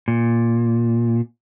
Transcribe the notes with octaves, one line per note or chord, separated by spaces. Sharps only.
A#2